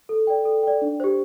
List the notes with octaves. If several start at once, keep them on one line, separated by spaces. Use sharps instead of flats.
A4
D5 G5
A4
D5 G5
D4
G4 C5